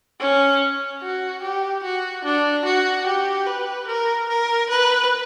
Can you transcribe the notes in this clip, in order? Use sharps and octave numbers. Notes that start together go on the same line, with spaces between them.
C#4
F#4
G4
F#4
D4
F#4
G4
B4
A#4
A#4
B4